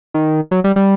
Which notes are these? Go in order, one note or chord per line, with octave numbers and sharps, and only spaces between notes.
D#3
F#3
G3
G3